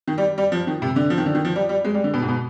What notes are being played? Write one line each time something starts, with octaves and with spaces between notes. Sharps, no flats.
D#3
G3
G3
F3
D#3
C3
D3
F3
D#3
D3
D#3
F3
G3
G3
G#3
G3
D3
B2
G#2
B2